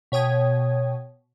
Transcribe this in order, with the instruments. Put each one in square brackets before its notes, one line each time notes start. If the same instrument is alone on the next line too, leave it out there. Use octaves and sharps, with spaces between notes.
[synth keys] B2 C#5 G5 D#6 G#6